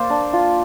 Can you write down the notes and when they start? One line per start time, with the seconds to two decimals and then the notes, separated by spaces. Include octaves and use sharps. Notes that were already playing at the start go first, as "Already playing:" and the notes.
Already playing: A#3 C5 D5
0.10 D4
0.33 F4